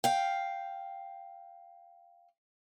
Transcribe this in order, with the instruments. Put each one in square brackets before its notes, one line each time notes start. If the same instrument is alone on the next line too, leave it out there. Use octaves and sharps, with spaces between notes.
[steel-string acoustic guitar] F5 G5